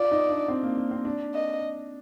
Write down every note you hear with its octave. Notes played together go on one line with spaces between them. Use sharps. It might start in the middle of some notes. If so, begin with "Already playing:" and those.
Already playing: F4 D5
D#4
D4
C4
A#3
A#3
C4
D4
D#5